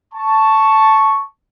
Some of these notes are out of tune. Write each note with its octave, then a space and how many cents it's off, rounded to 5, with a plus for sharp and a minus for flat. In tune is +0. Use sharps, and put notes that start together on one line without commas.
A5 +0 C#6 +0